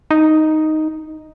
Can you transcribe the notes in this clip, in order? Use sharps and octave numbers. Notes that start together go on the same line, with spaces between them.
D#4